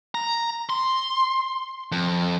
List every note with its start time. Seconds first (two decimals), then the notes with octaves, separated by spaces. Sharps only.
0.15 A#5
0.70 C6
1.92 F2